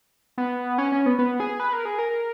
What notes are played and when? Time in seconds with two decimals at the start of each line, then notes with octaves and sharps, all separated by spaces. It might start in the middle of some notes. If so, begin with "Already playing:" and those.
0.38 B3
0.78 C#4
0.92 C#4
1.06 B3
1.19 B3
1.40 G#4
1.60 B4
1.73 A#4
1.85 G#4
1.99 A#4